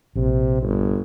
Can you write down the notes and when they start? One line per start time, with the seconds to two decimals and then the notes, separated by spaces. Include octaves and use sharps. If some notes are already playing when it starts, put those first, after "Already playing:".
0.16 A#1 C3
0.62 G1